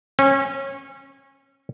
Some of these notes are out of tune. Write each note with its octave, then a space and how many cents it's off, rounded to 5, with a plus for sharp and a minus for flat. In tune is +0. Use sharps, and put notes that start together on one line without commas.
C#4 -25